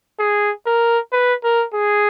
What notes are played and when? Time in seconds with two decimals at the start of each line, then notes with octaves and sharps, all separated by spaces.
0.19 G#4
0.66 A#4
1.12 B4
1.44 A#4
1.74 G#4